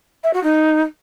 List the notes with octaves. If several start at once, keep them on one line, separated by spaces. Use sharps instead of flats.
E5
F#4
D#4